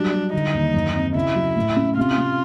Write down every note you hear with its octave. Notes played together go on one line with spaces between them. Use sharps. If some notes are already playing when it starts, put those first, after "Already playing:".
Already playing: F#3 G3 D4
G3
D3 D#4
D#2
F#2
C4
C#3 E4
F#3
A2
C#4
C3 F4
C3